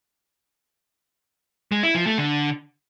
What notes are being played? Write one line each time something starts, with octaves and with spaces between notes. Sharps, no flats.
G#3
E4
F3
A3
D3